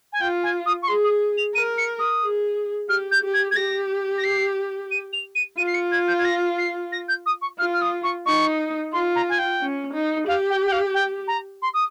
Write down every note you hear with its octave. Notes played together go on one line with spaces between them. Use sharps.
G#5
F4 G5
G#5
D#6
C#6
G#4 C6
D#6
F7
A#4 D#7
C#7
D#6
G#4
G4 F6
G6
G4
G#6
G#6
G4 A#6
A#6
C7
D#7
F7
D#7
F4 D#7
C7
C#7
G#6
G6
G#6
A#6
C7
A#6
G6
D#6
C#6
F4 F6
F6
D#6
C#6
D#4 C#6
F4 C6
A#5
G#5
G5
C#4
D#4
G4 F5
G5
G5
F5
G5
A#5
C6
D#6